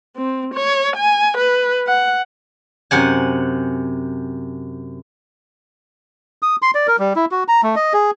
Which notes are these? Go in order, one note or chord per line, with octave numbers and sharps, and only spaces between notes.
C4
C#5
G#5
B4
F#5
F#2 C3 F#5 G#5
D#6
C6
D5
A#4
G3
E4
F#4
A#5
A3
D#5
G#4